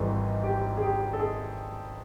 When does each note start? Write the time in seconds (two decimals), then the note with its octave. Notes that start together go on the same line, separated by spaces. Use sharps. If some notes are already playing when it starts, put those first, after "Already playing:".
Already playing: G#1 G#2 E3 G3 A4
0.43 G4
0.77 G#4
0.82 G4
1.13 A4
1.20 G#4